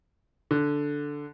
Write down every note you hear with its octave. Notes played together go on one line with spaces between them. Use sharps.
D3